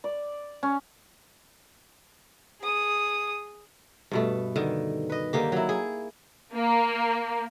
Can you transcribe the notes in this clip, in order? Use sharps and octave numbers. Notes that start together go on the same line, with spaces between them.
D5
C#4
G#4 D#6
G2 B2 A3
D3 D#3
B4 D#5
D3 D#3 A#3 G4
F#3 E4
G#4
A#3